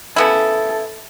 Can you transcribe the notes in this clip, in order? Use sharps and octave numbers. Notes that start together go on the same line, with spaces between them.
C#3 B3 E4 A4